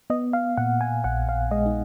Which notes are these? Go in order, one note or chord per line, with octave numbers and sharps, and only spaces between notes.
B3 D#5
F5
A#2 F#5
G#5
A#1 F#5
F5
G#3 D#5
D#4